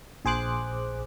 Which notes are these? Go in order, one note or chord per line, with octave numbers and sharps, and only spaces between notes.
A#1 G#4 C5 D6 F#6